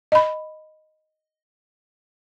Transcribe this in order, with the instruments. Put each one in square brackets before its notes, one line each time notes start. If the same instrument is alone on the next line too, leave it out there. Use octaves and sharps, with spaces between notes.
[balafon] D#5 B5